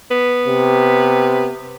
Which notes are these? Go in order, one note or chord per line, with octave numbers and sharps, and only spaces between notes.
B3
C3